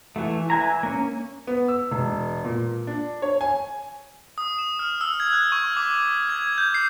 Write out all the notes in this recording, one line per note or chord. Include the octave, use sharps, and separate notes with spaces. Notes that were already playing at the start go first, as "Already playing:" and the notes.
E3 A3
B4 E5 G#5 A#5
A#3 C#4
B3
E6
E1
A#2
D4
C#5
G#5
D#6
E7
F6
E6
G#6
F#6
C#6
D6
G#6
G6
C7